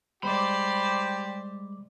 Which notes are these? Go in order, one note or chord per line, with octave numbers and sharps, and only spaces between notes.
G3 G#3 G4 C5 D5 B5 D6